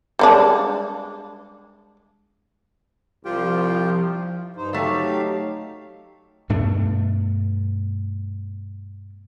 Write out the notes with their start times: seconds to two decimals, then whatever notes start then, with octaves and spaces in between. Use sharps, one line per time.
0.19 G3 G#3 D4
3.25 C2 F3 F4 G4 G5
4.56 G2 D#4 C5
4.73 F#3 A3 D#4 G4 C#5 F5
6.49 G2 B2 A3 D4